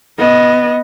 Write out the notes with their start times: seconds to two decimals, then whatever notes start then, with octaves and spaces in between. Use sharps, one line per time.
0.18 B3 D#5